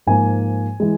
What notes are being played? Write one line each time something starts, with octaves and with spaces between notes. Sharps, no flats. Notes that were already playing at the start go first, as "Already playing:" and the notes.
G#2 F3 A#3 G#5
E3 G#3